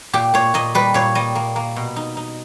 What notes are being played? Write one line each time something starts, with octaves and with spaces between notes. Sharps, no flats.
A#2 G4
A#2 C#5
A#2 D#5
G3 B4
A#2 C#5
G3 D#5
A#3
A#3
B2
D#4
D#4